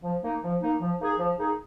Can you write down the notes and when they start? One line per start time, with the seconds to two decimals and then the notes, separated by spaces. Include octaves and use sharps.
0.04 F3
0.23 A#3 D#4
0.43 F3
0.62 A#3 D#4
0.80 F3
1.00 A#3 D#4 G#4
1.19 F3
1.38 A#3 D#4 G#4